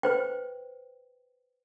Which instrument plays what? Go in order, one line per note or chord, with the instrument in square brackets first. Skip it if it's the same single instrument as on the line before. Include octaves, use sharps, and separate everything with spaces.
[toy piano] B4 C5 G5